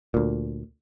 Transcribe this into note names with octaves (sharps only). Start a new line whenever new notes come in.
D2 A#2